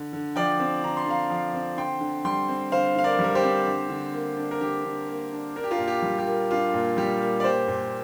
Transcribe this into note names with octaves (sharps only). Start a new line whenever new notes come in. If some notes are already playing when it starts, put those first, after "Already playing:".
Already playing: D3
D3
F3 D5 G5
C4
D3 A#5
C6
D3 F5 A#5
F3
C4
D3 G5 C6
D3
G3 G5 C6
C4
D3 C5 F5
D3 F5
A#4 D5
G3
A#4
G4 C5
C4
D3
D3
A#3
D4
A#4
D3 G4
D3
A#3
D4
D4 A#4
G4
F4 A#4
A#2
G4
G3
G4
A#3
D4 F4
A#2
G3 G4
A#3
D5
A#2 G4 C5
A#2